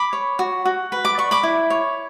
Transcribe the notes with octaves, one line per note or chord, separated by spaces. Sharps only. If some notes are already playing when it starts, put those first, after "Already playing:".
Already playing: B5 D6
C#5
F#4
F#4
B4
D6
D5 C#6
B5 D6
E4
C#5